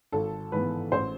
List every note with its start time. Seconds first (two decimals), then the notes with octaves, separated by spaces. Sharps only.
0.12 G#1 A4
0.52 G#2 E3 B3 B4
0.92 A1 C5